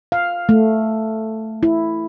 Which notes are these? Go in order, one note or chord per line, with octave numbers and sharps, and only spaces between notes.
F5
A3
E4